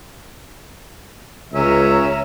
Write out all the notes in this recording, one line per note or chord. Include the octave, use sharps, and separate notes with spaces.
C#2 C#4 C#5 E5 A#5